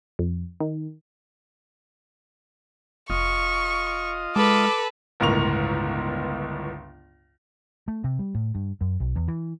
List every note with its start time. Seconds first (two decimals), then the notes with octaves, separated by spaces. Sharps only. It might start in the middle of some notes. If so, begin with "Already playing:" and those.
0.19 F2
0.60 D#3
3.10 F1 F4 D#5 C#6
4.36 G#3 A4 B4 D6
5.20 G1 C#2 A2 A#4 C#6 F7
7.88 A3
8.04 C3
8.19 G3
8.35 A2
8.55 G2
8.81 F#2
9.00 B1
9.16 E2
9.28 E3